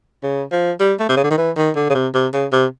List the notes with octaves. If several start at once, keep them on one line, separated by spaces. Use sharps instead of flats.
C#3
F3
G3
A3
C3
C#3
D3
D#3
E3
D#3
D3
C#3
C3
C3
C#3
C3